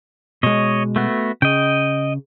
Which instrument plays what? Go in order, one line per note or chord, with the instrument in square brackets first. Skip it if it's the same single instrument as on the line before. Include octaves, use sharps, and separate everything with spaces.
[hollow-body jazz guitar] B2 G#3 [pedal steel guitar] C#5 D#5
[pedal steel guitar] A3 B3 F#4
[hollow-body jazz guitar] C#3 [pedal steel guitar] D#5 G5